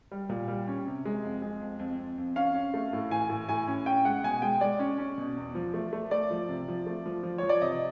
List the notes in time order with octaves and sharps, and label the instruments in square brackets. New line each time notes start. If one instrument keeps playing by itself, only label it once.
[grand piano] G3
A#2
G3
C#4
C3
G#3
F2
G#3
F2
F2
F2
F2
C#4 F5
C#4
A3
A2
E3 G#5
A2
A2 G#5
C#4
C#4 G5
G#3 F#5
B2 G#5
G#3 G5
G#3 D5
C#4
C#4
B2
E2
F3
A3
A3
A3 D5
F3
C3
F3
A3
F3
F3
F3 C#5
D5
C3 D#5